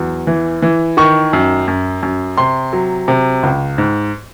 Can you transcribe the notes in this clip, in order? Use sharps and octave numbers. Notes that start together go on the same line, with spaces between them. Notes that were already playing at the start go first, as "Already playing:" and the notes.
Already playing: E2 F#3
E3
E3
D#3 C#6
F#2
F#2
F#2
C3 C6
F#3
C3
C#2
G#2